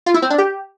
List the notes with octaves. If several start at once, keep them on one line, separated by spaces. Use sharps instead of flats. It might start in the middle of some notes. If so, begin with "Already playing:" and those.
F4
E4
C4
D4
G4